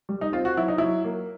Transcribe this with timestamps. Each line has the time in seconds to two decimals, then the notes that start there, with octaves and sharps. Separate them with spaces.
0.09 G3
0.21 D#4
0.33 C4 F4
0.45 F#4
0.57 F#3 E4
0.68 D#4
0.78 F#3 E4
1.04 A#3